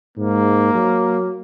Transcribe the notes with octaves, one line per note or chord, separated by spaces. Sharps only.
G#2 A#3
F#3